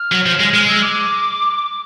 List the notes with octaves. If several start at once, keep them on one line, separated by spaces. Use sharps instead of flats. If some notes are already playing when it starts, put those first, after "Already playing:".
Already playing: F6
F#3
F3
G#3
G#3 F6
E6
D6